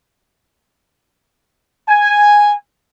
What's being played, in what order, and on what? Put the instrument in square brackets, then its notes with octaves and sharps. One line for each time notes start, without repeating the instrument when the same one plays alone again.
[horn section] G#5